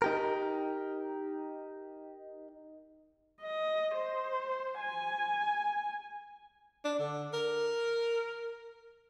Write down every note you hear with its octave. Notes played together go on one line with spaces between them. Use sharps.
D#4 G4 A#4
D#5
C5
G#5
D4
D3
A#4